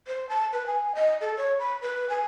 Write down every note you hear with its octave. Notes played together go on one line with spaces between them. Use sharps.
C5
A5
B4
G#5
D#5
A4
C#5
B5
B4
G#5